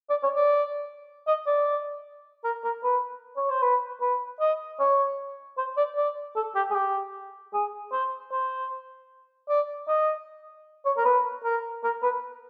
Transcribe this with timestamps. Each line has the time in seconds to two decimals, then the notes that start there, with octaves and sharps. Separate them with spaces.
0.10 D5
0.23 C#5
0.36 D5
1.27 D#5
1.47 D5
2.44 A#4
2.64 A#4
2.84 B4
3.37 C#5
3.50 C5
3.62 B4
4.01 B4
4.40 D#5
4.80 C#5
5.58 C5
5.77 D5
5.96 D5
6.36 A4
6.55 G4
6.70 G#4
6.75 G4
7.53 G#4
7.92 C5
8.32 C5
9.49 D5
9.88 D#5
10.86 C#5
10.97 A#4
11.05 B4
11.44 A#4
11.83 A#4
12.03 B4